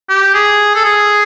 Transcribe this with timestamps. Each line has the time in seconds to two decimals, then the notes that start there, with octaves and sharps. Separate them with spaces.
0.09 G4
0.34 G#4
0.75 A4
0.85 G#4